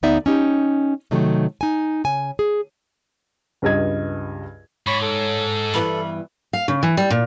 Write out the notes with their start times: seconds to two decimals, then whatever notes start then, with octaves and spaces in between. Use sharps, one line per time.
0.03 D2 B3 D#4 D5 E5
0.26 C#4 D#4 G4
1.11 C3 D#3 F#3 A3
1.61 D#4 G#5
2.04 C#3 G#5
2.39 G#4
3.62 C#2 G2 D#5 G#6
4.87 G#2 C#5 B5 C#6
5.02 A4
5.74 G2 E3 B3 B5
6.53 F5
6.68 C#3
6.83 E3
6.97 G3
7.10 A#2